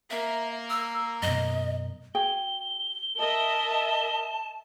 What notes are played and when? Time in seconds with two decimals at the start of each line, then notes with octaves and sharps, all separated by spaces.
0.10 A#3 A#4 E5
0.70 E6
1.22 F#2 B2 D#5
2.15 F#4 G#4 G5 G7
3.18 A#4 D#5 E5 A5